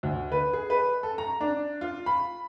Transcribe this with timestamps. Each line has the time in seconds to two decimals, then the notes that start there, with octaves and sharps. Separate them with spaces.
0.03 D2
0.32 B4
0.53 G#4
0.70 B4
1.03 A4
1.18 A#5
1.41 D4
1.81 F4
2.06 B5